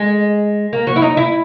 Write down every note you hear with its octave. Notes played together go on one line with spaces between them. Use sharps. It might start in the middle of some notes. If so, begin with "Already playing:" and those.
Already playing: G#3
A#3
F#3
E4
D#4
E4